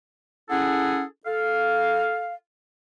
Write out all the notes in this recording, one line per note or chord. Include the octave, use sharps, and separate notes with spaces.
C#4 E4 G#4 A4 F#5
A4 F5